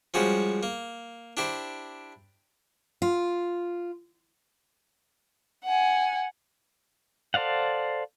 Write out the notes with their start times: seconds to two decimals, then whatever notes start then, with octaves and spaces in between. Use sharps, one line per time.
0.14 F3 G3 G#3 C#4 F#4
0.63 A#3
1.37 D4 E4 G4 C5
3.02 F4
5.65 F#5 G#5
7.34 A4 C5 D5 F5 F#5